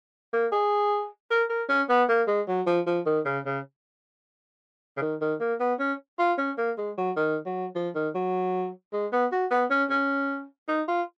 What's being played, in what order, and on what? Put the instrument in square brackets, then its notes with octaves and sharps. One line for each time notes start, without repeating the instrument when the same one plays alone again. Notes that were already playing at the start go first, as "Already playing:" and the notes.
[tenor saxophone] A#3
G#4
A#4
A#4
C#4
B3
A#3
G#3
F#3
F3
F3
D#3
C#3
C#3
C#3
D#3
D#3
A#3
B3
C#4
F4
C#4
A#3
G#3
F#3
D#3
F#3
F3
D#3
F#3
G#3
B3
F#4
B3
C#4
C#4
D#4
F4